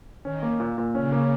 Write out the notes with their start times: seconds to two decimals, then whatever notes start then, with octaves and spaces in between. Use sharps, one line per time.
0.24 D#3 C#4
0.43 A#3
0.60 A#2
0.78 A#2
0.95 C#3 C#4
1.12 A#3